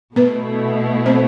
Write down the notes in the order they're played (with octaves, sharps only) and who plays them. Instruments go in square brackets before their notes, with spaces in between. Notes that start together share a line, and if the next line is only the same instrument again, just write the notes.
[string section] B2 A3 E4 [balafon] B3 B4
[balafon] C4 C5